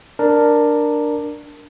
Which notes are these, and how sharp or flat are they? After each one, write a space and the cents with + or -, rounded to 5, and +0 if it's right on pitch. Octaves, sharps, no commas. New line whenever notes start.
D4 +5 A#4 +0